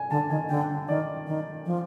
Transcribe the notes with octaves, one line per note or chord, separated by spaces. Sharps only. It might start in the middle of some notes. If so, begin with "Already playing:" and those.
Already playing: G#5
D3 A5
D#3 G#5
D3 G5
D#3 D5
D#3
F3